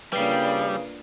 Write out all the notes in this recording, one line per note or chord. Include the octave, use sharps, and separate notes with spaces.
C#3 G3 A#3 D4 F4 B4 C7